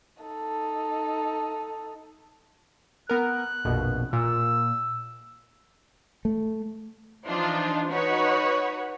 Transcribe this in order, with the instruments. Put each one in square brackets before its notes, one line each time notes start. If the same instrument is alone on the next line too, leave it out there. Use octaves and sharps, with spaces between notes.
[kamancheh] D#4 A4
[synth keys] B3 A#4 [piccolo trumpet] F#6
[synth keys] A#1 F2 B2
[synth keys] A#2 [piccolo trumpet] E6
[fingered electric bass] A3
[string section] E3 F3 D4 D#4 F4
D#4 F#4 B4 C#5